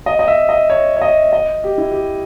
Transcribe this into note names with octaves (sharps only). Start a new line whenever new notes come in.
D#5
D#5
E5
D#5
C#5
C#5
D#5
D#5
G4
E4
G4